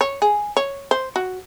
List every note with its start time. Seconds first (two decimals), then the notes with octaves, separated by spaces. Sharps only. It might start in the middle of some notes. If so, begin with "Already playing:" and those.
0.01 C#5
0.22 G#4
0.57 C#5
0.91 C5
1.16 F#4